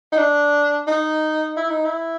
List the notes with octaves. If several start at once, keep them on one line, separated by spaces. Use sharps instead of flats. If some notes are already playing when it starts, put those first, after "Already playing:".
D#4
D4
D#4
E4
D#4
E4